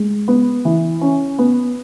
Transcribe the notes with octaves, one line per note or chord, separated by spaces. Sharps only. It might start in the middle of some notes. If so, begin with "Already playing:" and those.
Already playing: G#3
B3
E3
C#4
B3